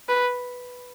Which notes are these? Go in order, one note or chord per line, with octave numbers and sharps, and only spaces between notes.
B4